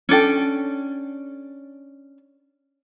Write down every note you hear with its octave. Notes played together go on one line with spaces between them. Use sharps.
C#4 D4 A4 G5